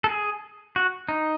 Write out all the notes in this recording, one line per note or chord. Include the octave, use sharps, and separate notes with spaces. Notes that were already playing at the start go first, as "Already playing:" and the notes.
A4
G#4
F#4
D#4